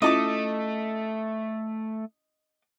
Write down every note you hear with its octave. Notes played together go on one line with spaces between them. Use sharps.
A3 C#4 E4 F4 D#5 A5 D6